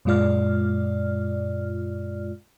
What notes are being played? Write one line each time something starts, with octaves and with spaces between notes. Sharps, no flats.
F#2 A#2 G#3 F4 D5 F6